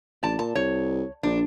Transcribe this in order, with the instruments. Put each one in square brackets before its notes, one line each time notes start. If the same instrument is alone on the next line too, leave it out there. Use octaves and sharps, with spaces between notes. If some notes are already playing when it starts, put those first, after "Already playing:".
[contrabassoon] A1 [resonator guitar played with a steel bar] D5 A5
[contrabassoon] A#2 [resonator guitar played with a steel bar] A5
[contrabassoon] C2 [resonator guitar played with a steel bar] C#5
[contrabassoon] A#1 [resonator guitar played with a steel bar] D4